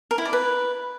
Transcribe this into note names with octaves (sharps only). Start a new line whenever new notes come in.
A#4
E4
D5
B4